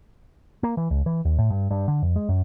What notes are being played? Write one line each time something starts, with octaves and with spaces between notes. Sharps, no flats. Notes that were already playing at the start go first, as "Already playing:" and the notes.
A#3
E3
C#2
E3
D#2
A2
G2
G2
D3
F2
G#3
F#2